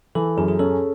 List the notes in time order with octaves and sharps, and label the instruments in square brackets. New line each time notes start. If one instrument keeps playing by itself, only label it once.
[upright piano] E3 [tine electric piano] A4
[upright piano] F#2 [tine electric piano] G#4
[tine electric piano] G#4
[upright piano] C#4 [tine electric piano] A4